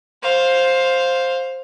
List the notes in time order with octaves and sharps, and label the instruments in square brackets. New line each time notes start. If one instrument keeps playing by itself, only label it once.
[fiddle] C5 F5